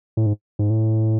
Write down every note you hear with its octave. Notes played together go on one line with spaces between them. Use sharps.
A2
G#2
G#2
A2